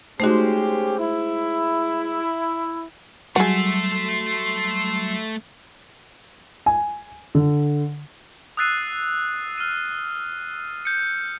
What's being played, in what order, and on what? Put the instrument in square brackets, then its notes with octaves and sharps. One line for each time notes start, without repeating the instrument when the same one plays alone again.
[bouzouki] G#3 C5 [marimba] A3 D#4 F#4 [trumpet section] C#4 G4
[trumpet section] E4
[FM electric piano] F#3 G3 F#4 [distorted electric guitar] A3 E5 [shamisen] G#4 F#5 [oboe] C6
[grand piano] G#5
D3
[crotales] D#6 E6 F#6 A6 C7 D#7
F6 D#7
G6 C#7